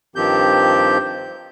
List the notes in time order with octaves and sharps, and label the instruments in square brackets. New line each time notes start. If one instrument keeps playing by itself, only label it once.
[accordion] G2 D#3 F3 C4 G4 G6